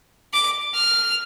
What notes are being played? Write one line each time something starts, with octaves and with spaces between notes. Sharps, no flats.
D6
F6